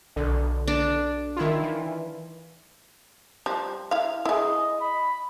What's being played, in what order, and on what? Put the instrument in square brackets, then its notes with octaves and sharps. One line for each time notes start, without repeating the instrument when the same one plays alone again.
[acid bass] B1 [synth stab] D3
[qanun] D4
[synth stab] D#3 E4 F4
[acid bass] E3
[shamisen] F3 G3
E4 F5
[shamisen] E4 G#4 [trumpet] D#5
[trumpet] B5